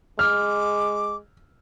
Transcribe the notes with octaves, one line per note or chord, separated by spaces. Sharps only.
G#3 D6 F6